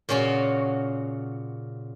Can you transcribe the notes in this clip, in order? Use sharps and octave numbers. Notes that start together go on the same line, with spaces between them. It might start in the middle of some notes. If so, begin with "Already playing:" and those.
A#2 C#3 C#4 F4 F#4